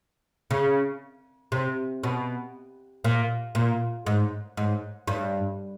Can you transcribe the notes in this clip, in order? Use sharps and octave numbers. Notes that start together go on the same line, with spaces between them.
C#3
C3
B2
A#2
A#2
G#2
G#2
G2